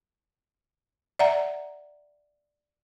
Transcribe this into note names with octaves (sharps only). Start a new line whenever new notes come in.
D5 E5 F#5 A#5